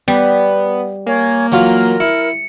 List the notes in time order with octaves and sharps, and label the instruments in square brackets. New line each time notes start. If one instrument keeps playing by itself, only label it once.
[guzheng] G3 [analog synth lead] B3
[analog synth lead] A#3 [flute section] C#5 G#5
[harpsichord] E3 F#3 F4 [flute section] A#4 F6
[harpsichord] E4 [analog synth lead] C#7